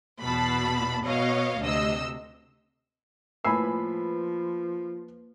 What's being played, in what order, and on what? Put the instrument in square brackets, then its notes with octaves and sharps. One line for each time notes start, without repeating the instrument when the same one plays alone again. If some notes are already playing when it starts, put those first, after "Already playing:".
[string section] E2 B2 A5 B5
B2 C#5 D#5 F5
D2 C3 D#5 E6
[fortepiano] A2 G#5 E6 [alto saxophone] F3 [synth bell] A#3 B4 [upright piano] B5 C7